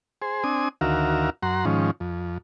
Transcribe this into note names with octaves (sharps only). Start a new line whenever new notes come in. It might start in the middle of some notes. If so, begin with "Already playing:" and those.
G#4 C5
C4 D4 G#5 D#6
D2 D#3 F#4 A#4 E5 F5
F#2 F#5 A#5 C6
G#2 D#3 F3 C#4
F2